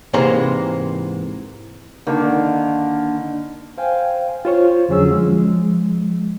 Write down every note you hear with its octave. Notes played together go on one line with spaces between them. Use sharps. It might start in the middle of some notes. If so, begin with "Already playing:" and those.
G#2 C3 E3 A#3 C5 A#5
D3 D#3 A#3
C5 F5 G5 G#5
F4 C5 C#5
F2 D3 F#3 C#4 G#4 E6
F3 G#3